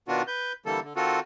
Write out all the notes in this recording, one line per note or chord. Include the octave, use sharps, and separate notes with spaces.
B2 D#3 B3 D4 F4 F#4
B4 G6
D3 E3 G3 A#3 A4
D3
D#3 C4 F4 F#4 A4